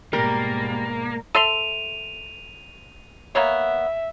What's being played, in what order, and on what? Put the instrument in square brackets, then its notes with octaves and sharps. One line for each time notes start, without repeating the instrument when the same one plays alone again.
[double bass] G#2 B2 [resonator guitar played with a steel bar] G3 [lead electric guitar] A#3 [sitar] A#4
[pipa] A4 E5 C6 [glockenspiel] D#7 F7
[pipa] A#3 B3 C#5 [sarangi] E5